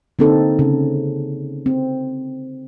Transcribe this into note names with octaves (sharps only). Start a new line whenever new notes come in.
D3 A#3 C4 D#4 A4
C#3
C4